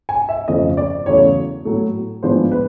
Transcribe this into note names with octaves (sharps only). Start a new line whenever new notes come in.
G#5
E5
F2 C#3 F3 A3 D#5
D5
E2 C#3 F#3 A3 C#5
A2 F#3 A3
A2 F3 G#3 B3 D4 C5
B4